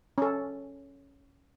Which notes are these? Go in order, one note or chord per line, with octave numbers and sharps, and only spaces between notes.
C#4 A4